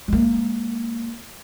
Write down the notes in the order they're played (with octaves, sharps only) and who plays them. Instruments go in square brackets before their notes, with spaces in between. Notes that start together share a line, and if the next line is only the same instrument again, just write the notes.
[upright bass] G#3 A#3